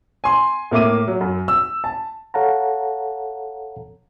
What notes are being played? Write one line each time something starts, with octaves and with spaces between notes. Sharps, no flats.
G#5 C6
A2 A#3 E5 D6 D#7
F#3
F#2
E6
A5
A4 C#5 F5 F#5 A5 A#5